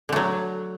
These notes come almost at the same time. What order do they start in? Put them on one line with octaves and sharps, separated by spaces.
D3 A3 F#3